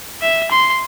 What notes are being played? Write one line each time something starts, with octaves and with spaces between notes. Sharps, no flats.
E5
C6